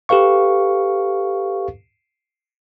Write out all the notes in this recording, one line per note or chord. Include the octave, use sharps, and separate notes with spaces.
G4 A4 B4 F5 C#6